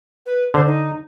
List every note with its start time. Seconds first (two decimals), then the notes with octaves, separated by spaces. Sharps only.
0.26 B4
0.54 D3 C5
0.66 D#4